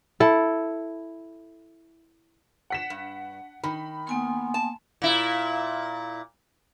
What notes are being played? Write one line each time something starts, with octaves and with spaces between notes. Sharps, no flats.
E4 A4
F#5 B6 E7
G2
D#3 B5
A#3 B3 G#5 C6
A5
A#2 E4